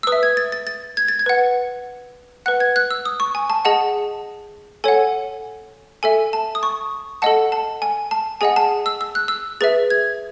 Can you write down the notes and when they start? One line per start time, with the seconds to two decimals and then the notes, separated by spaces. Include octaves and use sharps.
0.03 E6
0.07 B4 D#6
0.12 E5
0.23 G#6
0.37 A6
0.52 A6
0.67 A6
0.97 G#6
1.08 A6
1.19 G#6
1.26 B4 F#5
2.46 B4 F#5 F#6
2.60 G#6
2.76 F#6
2.90 E6
3.05 D#6
3.20 C#6
3.35 G#5
3.50 A5
3.65 G#4 D#5 F#5 A5
4.84 A4 C#5 F#5 G#5
6.03 A4 E5 G#5
6.33 A5
6.55 D#6
6.63 C#6
7.22 A4 D#5 F#5 A5
7.52 A5
7.82 G#5
8.11 A5
8.41 G#4 D#5 F#5 G#5
8.56 A5
8.86 E6
9.01 E6
9.15 F#6
9.28 E6
9.61 G#4 B4 E5 A6
9.90 G#6